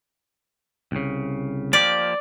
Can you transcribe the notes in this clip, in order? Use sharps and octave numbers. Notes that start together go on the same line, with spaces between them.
C2 C#3
F3 A#3 G4 D5